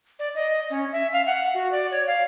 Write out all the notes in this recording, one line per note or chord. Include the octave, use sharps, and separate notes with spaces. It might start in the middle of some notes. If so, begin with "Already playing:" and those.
D5
D#5
C#4
E5
F5
F#5
F#4
D5
C#5
F5